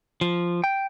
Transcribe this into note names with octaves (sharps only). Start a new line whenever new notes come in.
F3
G5